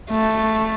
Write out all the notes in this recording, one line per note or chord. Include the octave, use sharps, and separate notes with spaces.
A3